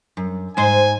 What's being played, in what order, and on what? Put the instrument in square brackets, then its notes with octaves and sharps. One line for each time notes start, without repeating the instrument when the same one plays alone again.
[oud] F#2
[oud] G#2 C5 [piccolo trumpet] G#5